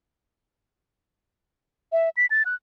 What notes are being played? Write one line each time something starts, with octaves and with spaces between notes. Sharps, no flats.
E5
B6
A6
F#6